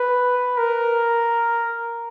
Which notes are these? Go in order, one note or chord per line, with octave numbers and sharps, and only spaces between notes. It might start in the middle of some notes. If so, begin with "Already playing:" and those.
Already playing: B4
A#4